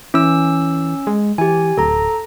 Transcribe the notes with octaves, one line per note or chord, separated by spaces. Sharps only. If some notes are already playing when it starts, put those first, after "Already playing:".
E3 C#4 E6
G#3
E3 G4 G#5
D1 A4 A#5